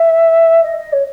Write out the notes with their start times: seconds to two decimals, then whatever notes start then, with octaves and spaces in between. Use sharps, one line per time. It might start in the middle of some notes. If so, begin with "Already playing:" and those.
Already playing: E5
0.63 D#5
0.77 D#5
0.93 C#5